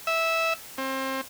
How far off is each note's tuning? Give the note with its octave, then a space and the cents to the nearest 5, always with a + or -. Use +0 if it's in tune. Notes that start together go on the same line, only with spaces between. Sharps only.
E5 -10
C4 +30